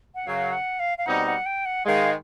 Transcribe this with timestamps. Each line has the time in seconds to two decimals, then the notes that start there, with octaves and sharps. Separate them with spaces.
0.15 F#5
0.27 F#2 C#3 F#3 F5
0.53 F#5
0.79 F5
0.98 F5
1.06 B2 G3 C4 D#4 F#5
1.26 F#5
1.46 G5
1.66 F#5
1.86 G#2 D#3 G#3 F5